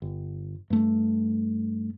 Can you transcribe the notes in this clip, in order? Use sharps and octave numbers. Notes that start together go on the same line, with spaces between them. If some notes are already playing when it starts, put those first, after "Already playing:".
G1
G2 A3